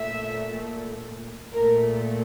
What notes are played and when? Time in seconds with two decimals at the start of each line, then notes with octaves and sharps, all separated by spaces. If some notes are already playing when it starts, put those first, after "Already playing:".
Already playing: A#2 A3 E5
1.53 A#2 A3 A#4